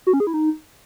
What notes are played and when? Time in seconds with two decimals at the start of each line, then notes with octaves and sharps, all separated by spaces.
0.07 F#4
0.13 C#4
0.20 G#4
0.27 E4
0.34 D#4